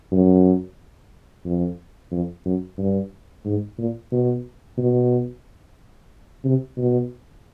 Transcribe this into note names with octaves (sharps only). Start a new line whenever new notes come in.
F#2
F2
F2
F#2
G2
G#2
A#2
B2
B2
C3
B2